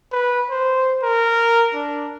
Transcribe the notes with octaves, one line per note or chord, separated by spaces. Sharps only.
B4
C5
A#4
D4